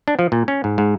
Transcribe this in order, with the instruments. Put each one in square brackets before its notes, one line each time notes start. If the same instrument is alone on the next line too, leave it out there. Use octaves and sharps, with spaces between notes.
[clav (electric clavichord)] D4
F3
A#2
C#4
G#2
G#2